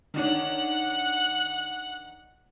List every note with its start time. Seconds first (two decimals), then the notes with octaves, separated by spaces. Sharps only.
0.14 D#3 D4 C#5 F#5 F#6